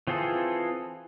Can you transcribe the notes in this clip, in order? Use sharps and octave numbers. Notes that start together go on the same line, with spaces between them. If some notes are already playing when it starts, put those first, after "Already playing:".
E3 C4 F4 G#4 A4